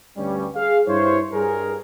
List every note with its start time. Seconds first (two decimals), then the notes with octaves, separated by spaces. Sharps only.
0.17 D2 G2 G3 C#4
0.55 G#4 F5
0.87 G2 E4 C5 C#5
1.33 G2 G#4 A#4